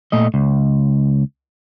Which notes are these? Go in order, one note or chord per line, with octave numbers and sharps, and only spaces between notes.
A#2 A3 D#5
C#2